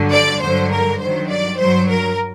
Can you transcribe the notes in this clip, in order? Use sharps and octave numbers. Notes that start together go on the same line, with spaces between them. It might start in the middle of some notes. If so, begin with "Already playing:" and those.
Already playing: G2 D3 F#3
D5
G2 D3 F#3 C5
A#4
G2 D#3 F#3 C5
D5
G2 F#3 C5
A#4